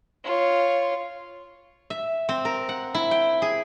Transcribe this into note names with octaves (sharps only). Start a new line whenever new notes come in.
F4 C#5
E5
C4
A#4
F#5
E4
G5
G#4